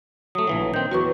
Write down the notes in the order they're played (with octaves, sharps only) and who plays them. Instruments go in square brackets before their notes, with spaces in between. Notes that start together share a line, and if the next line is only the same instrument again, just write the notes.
[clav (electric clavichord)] F#3 A3 [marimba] D#6
[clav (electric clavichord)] A#1 E3 F#3
[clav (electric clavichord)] D#3 C4 [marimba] G6
[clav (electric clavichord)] E2 F#3 [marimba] F#4 B4 C#6